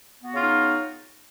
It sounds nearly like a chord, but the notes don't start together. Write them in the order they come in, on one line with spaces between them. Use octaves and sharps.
B3 F#4 C#3 F4 D#4